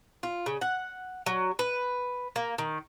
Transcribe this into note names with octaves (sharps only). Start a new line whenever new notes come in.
F4
C#3
F#5
F#3
B4
A#3
D#3